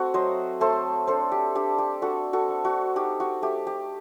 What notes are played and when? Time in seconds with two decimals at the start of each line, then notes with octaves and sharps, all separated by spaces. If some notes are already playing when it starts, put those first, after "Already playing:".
Already playing: A3 C4 F#4 A4
0.14 F#3 C5 D#5
0.61 A3 A4 C5
1.07 D4 A4 C5
1.32 G4
1.55 D4 G4
1.78 G4
2.02 D4 F#4 A4
2.33 F#4 A4
2.49 D4
2.65 F#4
2.96 D#4 G4
3.20 F#4
3.42 A3 G4
3.67 G4